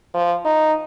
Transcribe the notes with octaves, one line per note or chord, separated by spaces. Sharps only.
F3
D#4